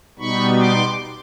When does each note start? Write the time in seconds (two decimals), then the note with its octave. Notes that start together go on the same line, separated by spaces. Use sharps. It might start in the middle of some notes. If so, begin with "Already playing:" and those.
0.19 B2 G3 B3 D#4 B5 C#6
0.57 C6 D6